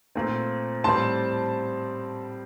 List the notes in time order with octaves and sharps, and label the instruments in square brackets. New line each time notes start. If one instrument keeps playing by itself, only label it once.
[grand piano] A#2 A3 C4
A2 G3 C4 A5 C6